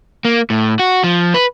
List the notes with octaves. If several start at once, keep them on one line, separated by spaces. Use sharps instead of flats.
A#3
A2
F#4
F3
B4